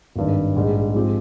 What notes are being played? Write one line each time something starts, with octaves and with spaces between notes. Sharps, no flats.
G#1 G2 D#3
A#1 G#2 G3
G#2 F3 G#3 C4 G4